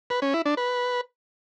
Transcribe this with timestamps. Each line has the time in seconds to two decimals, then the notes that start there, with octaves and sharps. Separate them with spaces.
0.10 B4
0.22 C#4
0.34 E4
0.46 D4
0.57 B4